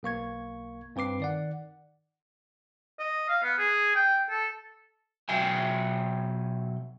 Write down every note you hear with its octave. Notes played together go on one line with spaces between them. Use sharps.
B1 A#3 C#6 G#6
G2 C4 B4 D6 C7
D#3 D5 F#5
D#5
F5
B3
G#4
G5
A4
B2 F#3 E5 G5 G#5